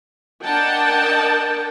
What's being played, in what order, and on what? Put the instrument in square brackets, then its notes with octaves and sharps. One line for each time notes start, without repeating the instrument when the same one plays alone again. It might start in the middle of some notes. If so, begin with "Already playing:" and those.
[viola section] D4 A#4 D#5 F#5 G5 A5